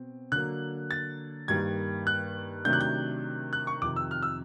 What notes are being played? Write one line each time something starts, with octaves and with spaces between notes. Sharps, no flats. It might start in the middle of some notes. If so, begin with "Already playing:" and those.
Already playing: B2 C4
D3 F#3 A#3 F#6
A6
G2 D#3 G3 A#3 G#6
F#6
C3 D#3 F#3 A3 D4 G6
F#6
G6
F#6
C#6
F2 C3 D#3 D6
E6
F6
E6